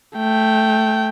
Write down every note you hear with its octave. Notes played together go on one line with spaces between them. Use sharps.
A3 G5